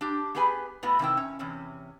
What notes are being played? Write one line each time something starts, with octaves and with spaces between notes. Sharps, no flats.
D4 G4
B3 G4 G#4 B4 G#5
A2 B3 F#4
C3 D#3 E4 G5
C#4
E2 C3 C#4